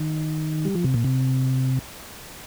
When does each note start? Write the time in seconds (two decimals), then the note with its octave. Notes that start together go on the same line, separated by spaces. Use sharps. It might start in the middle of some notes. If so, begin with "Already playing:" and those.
Already playing: D#3
0.65 G3
0.75 F3
0.84 C3
0.94 A#2
1.04 C3